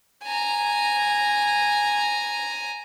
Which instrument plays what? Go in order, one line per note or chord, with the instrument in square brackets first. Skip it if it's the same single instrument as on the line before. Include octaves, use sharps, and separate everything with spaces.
[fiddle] G#5 A#5